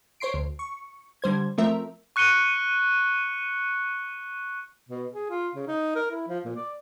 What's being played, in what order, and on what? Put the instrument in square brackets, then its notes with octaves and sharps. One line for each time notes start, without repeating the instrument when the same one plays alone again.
[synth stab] C5 C#5 C6 C7 D7
D2
C#6
D3 G3 C5 G#6
F3 A3 C4 A#4 E5
[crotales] C#6 F#6 C#7 D#7 G7
[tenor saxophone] B2
G#4
F4
C#3
D#4
A#4
E4
F3
A#2
D5